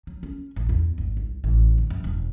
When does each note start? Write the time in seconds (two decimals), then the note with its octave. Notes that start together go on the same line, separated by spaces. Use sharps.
0.07 F#3
0.23 C#4
0.56 A1
0.69 E2
0.98 G#1
1.17 C2
1.44 A1
1.78 D3
1.90 F#2
2.04 E1